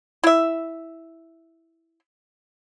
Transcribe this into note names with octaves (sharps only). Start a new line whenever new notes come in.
E4 E5